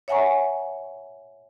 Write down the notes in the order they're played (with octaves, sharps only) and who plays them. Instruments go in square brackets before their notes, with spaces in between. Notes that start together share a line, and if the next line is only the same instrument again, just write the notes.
[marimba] C#5 E5 F#5 G#5 A#5 C#6